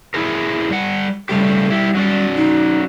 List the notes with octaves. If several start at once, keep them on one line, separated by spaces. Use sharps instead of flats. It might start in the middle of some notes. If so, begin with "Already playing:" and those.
E4 G#4 A#4
G3 F#5
C#3 G3 A3 G4
E4 G4
F#3 C#4 D5
D#4